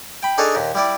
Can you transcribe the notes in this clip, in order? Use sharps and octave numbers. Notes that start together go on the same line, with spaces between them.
G5 B5
D4 D#4 G#4 A4 C#5
D#2 A#2
G3 E4 D5